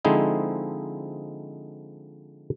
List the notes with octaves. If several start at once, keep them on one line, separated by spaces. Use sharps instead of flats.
D3 F3 G#3 C4 D#4 E4